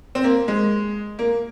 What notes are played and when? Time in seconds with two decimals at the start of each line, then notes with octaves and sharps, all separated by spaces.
0.15 C4
0.24 A#3
0.48 G#3
1.19 A#3